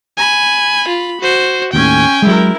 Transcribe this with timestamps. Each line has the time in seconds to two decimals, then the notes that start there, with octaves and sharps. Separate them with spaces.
0.17 G#5 B5
0.89 F4
1.21 F#4 C5
1.73 D#2 A2 C#4 G5 G#5
2.22 F#3 G#3 E4 A#4